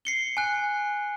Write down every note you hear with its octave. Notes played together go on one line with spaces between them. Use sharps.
C7 C#7 G7
G#5 F#6